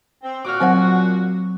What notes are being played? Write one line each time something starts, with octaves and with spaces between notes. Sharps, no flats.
C4
A#2 F#4 D6 F6
F#3 C4 C5 F#5